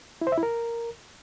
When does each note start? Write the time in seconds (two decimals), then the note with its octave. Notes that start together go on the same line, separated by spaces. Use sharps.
0.21 E4
0.27 C5
0.32 E5
0.37 E4
0.43 A#4